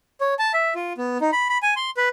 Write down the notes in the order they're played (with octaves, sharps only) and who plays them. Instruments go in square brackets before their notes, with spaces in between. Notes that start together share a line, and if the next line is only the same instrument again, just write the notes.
[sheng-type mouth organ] C#5
A5
E5
F4
B3
D#4
B5
B5
G#5
C6
B4